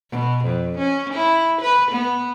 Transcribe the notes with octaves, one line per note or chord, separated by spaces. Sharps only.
B2
F2
C#4
E4
B4
B3